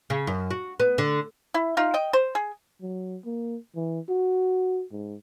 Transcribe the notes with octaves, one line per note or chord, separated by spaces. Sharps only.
C#3
F#2
F#4
B3
D3
E4
D#4 F4
D#5 G5
C5
G#4
F#3
A#3
E3
F#4
G#2